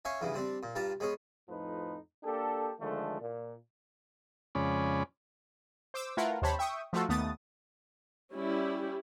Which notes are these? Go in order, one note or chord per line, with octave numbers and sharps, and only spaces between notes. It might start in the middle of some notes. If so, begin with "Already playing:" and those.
C#4 E5 F5 G#5 C#6
E2 G2 C#3 E3
G3 C4 D4
A#2
G2 G3 F4 A5 A#5
G#3 B3 C#4 G#4
F2 A2 F3 D#4 B4
A#3 D4 G4 A4
D3 D#3 F3 G#3 A3
A#2
F2 C#3 G#3 C#4 D5 B5
C5 D6 E6
A3 E4 F4 A#4 B4 F#5
D#2 C3 C5 C#5 A5 B5
E5 G5 C#6 D#6
F3 A3 F4 F#4 A4
D#2 A3 B3 D#6 A6
G3 C#4 E4 G4